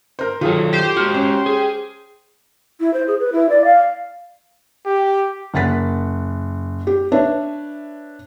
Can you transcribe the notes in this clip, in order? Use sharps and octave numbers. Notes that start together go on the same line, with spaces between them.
A#4 C5
D#3 F#3 F4 G#4 A4
G4 C5
G#3 F#4 F6
C#4
G#4
E4
C5
G#4
B4
E4
D5
F5
G4
F#1 A#4 F#5 A6 B6
G4
D4 B4 C#5 E5